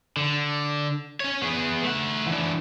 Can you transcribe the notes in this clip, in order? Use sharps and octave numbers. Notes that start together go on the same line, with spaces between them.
D3
C#4 C#5
B3 G#4
A3 F#5
E3 D4